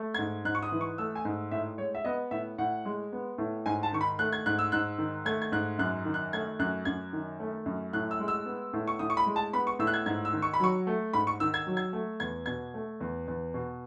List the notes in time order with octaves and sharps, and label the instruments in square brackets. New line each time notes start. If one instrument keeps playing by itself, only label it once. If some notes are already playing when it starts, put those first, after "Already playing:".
Already playing: [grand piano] A3
G#6
G#2
G#2 F#6
C#6
D#6
E3
C#6
A3 E6
G#5
G#2
A2 E5
G#3 C#5
E5
B3 D#5
A2 E5
A2 F#5
G#3
B3
A2
G#2 G#5
A5
D#3 C#6
B5
A3 F#6
G#6
G#2 F#6
E6
G#2 F#6
D#3
A3 G#6
G#6
G#2 F#6
F#2 F#6
D#3
F#6
A3 G#6
F#2 F#6
F#2 G#6
D#3
A3
F#2
A2 F#6
E6
G#3
E6
B3
A2
C#6
A2 D#6
C#6
B5
G#3
A5
B3 B5
C#6
A2 E6
F#6
G#6
G#2 G#6
E6
D#3
C#6
B5
F#3 C#6
A3
G#2 B5
C#6
D#3 E6
G#6
F#3
G#6
A3
E2 G#6
B2 G#6
A3
E2
E2
B2